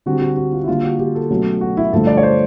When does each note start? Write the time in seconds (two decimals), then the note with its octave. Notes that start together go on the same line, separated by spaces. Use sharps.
0.06 D3 G3 C4 F#4
0.21 F#4
0.37 F#4
0.52 F4
0.63 E4
0.68 D3 G3 A#3 F4
0.84 F#4
0.99 G4
1.15 A4
1.30 B2 F#3 A3 C#4
1.61 F#4
1.77 E4
1.92 G2 D3 F3 A3 A4
2.07 D5
2.17 C#5
2.23 C5